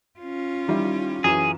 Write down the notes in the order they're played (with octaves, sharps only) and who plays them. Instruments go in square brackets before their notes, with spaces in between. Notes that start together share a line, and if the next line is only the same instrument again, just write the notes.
[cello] C#4 F4
[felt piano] D#3 G3 E4
[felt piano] F#2 E3 E7 [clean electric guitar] G#4